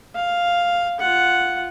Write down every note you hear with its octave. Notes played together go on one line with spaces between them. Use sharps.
F5
F4 F#5